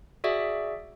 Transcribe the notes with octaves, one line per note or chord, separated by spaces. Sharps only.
F#4 G#4 D5 E5